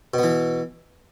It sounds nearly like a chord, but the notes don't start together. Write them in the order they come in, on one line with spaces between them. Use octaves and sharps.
B2 B3 E3